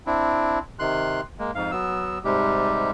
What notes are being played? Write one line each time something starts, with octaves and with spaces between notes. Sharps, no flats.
C4 D4 E4
C3 D#3 C6 F#6
G#3 A#3
F2 G#2 F5
F#3 B3 E6
G#2 C3 G3 G#3 G4